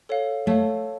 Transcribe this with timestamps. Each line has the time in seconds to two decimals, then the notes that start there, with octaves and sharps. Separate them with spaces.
0.09 A4 C#5 F5
0.46 A3 A4 C#5 F5